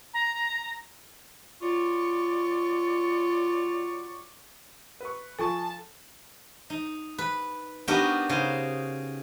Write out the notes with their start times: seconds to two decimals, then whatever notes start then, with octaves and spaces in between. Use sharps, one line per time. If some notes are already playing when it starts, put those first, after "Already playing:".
0.13 A#5
1.62 F#3 F4 D5 C#6
5.00 B4 C#6
5.39 F3 A4 G#5 A5 C#6
6.70 D#4
7.18 B4
7.88 B3 D4 D#4 F#4 G4 A#4
8.29 C#3 D#4 C5